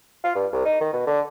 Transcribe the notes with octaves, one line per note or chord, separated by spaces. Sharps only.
F4
G2
C2
D#4
D#3
B2
D3